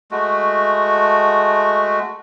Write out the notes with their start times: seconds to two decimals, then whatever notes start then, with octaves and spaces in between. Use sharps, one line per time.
0.11 G#3 A3 F#4